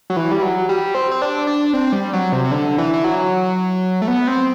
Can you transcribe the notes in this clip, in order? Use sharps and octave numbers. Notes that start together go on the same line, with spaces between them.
F#3
E3
G3
F#3
G3
C4
C4
D4
D4
C4
G3
F#3
C3
C3
D3
E3
E3
F#3
A3
B3
C4